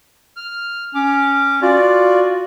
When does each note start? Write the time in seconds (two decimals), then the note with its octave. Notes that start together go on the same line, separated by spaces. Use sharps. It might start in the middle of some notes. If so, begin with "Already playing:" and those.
0.37 F6
0.95 C#4 D6
1.62 F4 F#4 D5